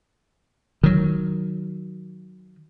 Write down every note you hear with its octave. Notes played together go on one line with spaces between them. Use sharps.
D#3 F#3